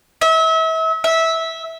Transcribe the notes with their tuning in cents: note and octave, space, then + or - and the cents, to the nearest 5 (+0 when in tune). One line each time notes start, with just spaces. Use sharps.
E5 -35
E5 -15